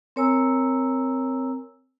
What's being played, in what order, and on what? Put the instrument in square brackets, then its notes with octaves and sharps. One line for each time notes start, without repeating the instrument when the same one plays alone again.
[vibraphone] C4 A#4 C#5 G#5 A#5 E6